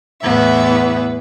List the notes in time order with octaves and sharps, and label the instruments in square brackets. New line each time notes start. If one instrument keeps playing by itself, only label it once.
[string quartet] E2 A2 B3 E5